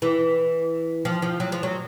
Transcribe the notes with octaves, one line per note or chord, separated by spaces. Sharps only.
E3
F3
F3
F#3
F3
F#3